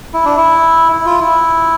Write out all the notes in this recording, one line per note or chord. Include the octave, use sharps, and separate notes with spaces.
E4
D4
E4
E4
F4
E4